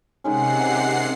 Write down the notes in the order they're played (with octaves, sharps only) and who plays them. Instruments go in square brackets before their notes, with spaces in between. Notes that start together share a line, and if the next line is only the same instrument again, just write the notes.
[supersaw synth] C3 F#5 C7 [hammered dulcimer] D#3 G#3 C#4